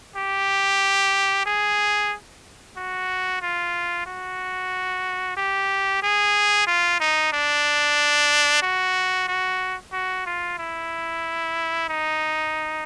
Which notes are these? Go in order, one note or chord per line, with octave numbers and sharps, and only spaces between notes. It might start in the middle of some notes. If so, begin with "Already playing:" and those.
G4
G#4
F#4
F4
F#4
G4
G#4
F4
D#4
D4
F#4
F#4
F#4
F4
E4
D#4